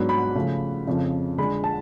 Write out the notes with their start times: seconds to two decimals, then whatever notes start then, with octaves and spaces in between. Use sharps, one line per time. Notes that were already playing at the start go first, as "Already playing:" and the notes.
Already playing: G#2 F#3 B3 D4
0.09 B5
0.35 C#3 F3 A3
0.87 F2 C#3 F3
1.38 D3 G#3 D4 B5
1.64 A5